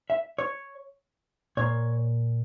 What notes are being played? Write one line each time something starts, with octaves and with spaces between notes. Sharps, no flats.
E5
C#5
A#2 A#3 C#5